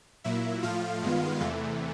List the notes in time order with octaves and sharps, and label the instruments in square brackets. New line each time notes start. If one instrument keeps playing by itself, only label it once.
[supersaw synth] A#2 F#3 A#3 E4 E5
A2 F3 A3 F4 F5
G2 D#3 G#3 B3
E2 C3 E3 A3